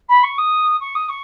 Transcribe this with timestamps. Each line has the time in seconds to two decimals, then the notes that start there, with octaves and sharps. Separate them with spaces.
0.09 B5
0.23 C#6
0.38 D#6
0.80 C#6
0.95 D#6
1.09 C#6